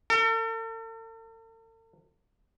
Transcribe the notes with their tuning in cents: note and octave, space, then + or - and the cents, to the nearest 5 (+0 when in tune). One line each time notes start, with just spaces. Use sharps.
A4 +45